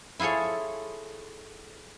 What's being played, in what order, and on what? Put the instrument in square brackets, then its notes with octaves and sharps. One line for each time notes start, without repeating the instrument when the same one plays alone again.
[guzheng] E4 F4 G#4 A4 C#5